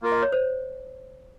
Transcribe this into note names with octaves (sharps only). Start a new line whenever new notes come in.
A#3 F4 A#4
D#5
C#5
C5